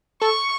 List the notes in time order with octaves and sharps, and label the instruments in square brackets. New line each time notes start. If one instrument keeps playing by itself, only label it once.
[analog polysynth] A4 [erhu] C#6